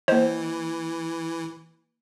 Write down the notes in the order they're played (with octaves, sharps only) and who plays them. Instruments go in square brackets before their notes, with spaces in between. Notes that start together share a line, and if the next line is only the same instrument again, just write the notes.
[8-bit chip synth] E3 [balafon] A#3 D#5 [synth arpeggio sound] C5